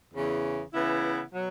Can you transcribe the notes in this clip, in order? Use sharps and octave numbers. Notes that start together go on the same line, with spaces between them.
E2 C#3 E3
C#3 E3 B3 E4
B2 F#3